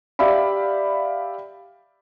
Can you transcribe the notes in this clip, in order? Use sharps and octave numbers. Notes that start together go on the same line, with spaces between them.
G4 D5 E5 F5 B5